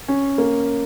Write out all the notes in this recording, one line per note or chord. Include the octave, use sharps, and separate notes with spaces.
C#4
A#3